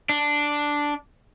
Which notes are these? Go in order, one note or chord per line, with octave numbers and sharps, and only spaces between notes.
D4